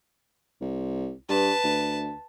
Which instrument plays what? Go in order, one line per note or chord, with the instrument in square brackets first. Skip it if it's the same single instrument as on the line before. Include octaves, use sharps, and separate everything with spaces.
[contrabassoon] C2
[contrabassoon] G2 [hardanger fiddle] B4 A5
[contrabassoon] D2